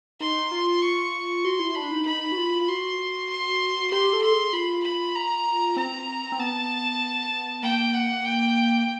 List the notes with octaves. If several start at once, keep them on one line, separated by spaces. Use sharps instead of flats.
D#4 C6
F4
C#6
F#4 C6
E4
D4 B5
D#4
D#4 B5
F#4
F4
F#4 C6
C6
G4 C6
A4
C6
G#4
F4 B5
B5
A#5
C4 A#5
C4
B3 A5
A#3 G5
F#5
G5